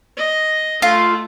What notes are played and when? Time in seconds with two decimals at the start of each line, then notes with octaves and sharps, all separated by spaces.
0.17 D#5
0.82 A3 F4